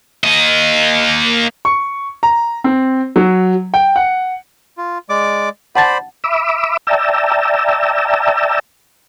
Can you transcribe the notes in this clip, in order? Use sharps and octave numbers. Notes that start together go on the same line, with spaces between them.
A#3 D#5
C#6
A#5
C4
F#3
G5
F#5
F4
G#3 D5 D6
C5 D5 F#5 A5 B5 A6
E5 B5 D6 E6
D5 E5 G5 A5 A#5 E6